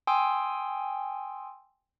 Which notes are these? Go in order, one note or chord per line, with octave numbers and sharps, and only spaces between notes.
G5 G#5 C6 D#6 E6